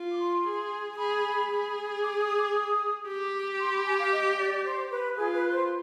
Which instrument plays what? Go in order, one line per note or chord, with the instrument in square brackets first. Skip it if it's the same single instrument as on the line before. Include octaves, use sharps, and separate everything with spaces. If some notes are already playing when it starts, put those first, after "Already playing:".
Already playing: [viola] F4
[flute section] D6
C6
[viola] G#4
[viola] G#4 [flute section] B5
[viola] G#4
[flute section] D6
D#6
D6
D#6
[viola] G4 [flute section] D6
[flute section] C6
B5
G#5
F5
D#5
D5
D5
C5
B4
[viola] F4 [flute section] G#4
[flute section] B4
C5